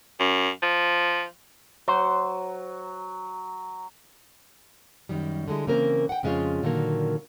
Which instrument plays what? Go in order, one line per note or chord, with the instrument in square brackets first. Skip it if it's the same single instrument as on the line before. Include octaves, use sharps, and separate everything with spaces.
[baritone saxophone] F#2
F3
[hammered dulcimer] F#3 [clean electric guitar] C5
[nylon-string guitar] F#2 D#3 G3
D3 G3 G#3 E4
C#3 E3 A#3 C4 A#4
F#5 G5
F2 C#3 G#3 D4 F4 C#5
A#2 D3 D#3 F#3 A#3